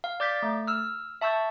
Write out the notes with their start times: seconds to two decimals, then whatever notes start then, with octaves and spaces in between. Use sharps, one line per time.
0.04 F5
0.20 D5 D6 G6 A6 B6
0.42 A3
0.67 E6 F6
1.21 E5 A5 C#6 E6 G6 A6